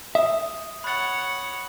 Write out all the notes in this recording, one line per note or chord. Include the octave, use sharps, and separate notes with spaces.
E5 D#6
C#5 F#5 B5 A6